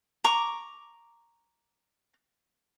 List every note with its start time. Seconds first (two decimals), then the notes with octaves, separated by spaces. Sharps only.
0.24 A#5 C#6 D6